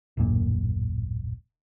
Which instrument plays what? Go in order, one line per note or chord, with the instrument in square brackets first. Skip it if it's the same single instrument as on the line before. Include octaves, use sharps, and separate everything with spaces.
[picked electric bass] D#1 A1 F#2 A#2